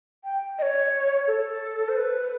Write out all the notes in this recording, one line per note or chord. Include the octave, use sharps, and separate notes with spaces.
G5
D#5
C#5
A4
C5
B4